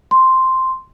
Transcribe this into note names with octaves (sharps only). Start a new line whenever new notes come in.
C6